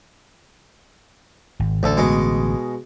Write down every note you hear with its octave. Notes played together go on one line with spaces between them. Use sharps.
G#1
A1 D2 D3 A4
B2 G#3